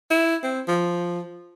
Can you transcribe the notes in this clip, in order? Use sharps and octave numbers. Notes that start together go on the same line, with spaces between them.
E4
C4
F3